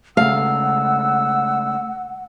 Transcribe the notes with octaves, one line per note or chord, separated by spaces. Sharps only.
C#3 G#3 A3 F5 F#5 E6